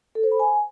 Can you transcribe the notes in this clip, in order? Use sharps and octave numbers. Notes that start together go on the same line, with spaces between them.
A4
C5
B5
G#5